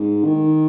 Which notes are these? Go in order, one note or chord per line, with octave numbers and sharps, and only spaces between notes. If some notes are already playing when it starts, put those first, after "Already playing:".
Already playing: G#2
D#3